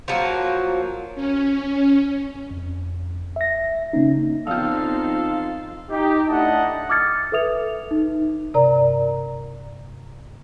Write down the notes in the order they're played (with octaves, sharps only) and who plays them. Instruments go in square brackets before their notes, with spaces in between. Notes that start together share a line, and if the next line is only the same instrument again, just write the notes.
[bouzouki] F3 F#3 A#3
[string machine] C#4
[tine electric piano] F2
E5 A#6
C#3 A#3 C#4 D#4
[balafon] F3 B3 [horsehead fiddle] C4 D#4 [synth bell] F4 F5 [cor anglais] A4
[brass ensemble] D#4 G4
A3 D4 E4 D#5 F#5 A5
[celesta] D6 D#6 F6 G#6 A6 C#7
A4 B4 E5 D#6 F7
D#4
[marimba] G2 C3 A#4 D5 A#5